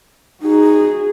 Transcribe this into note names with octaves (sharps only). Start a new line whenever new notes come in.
D#4 F#4 G#4